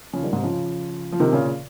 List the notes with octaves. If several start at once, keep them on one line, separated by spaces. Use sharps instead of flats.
C#3 F3
D#3 G3
G#2 C3
C#3 F3
F3
C3 D#3
A#2 C#3